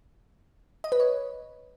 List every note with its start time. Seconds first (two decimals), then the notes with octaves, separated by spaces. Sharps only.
0.84 D#5
0.92 B4
1.00 C#5